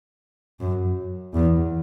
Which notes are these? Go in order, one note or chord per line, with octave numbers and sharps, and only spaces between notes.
F#2
E2